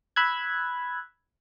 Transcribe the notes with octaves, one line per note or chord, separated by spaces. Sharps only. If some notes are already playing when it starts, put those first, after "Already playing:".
B5 E6 F#6 G#6